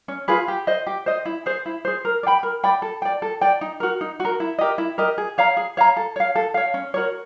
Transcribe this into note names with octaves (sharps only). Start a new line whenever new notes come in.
C#4
F4 G#4 B4
G4
C5 D#5
G4
C5 D#5
E4
G#4 C5
E4
G#4 C5
A#4
D5
G5 B5
A#4
D5 G5 B5
A4
D5 G5
A4
D5 G5
D#4
F#4 A#4
D#4
F#4
A#4
E4
G4 A#4 D#5
E4
G4 A#4 D#5
G#4
C#5 F5 A#5
G#4
C#5 F5 A#5
A4
C#5 F5
A4
C#5 F5
C#4
F#4 A#4 C#5